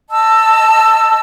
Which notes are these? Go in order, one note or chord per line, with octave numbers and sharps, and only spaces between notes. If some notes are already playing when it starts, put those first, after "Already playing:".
D#5 A5 E6